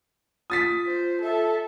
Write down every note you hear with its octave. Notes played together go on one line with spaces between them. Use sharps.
F4 D#6 A6 B6
C5
A4 E5